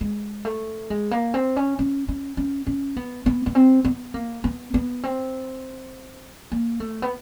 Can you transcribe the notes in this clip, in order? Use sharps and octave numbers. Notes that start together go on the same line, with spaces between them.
G#3
A3
G#3
A#3
C4
C#4
C#4
C#4
C#4
C#4
B3
B3
B3
C4
B3
A#3
B3
B3
C4
A#3
A3
B3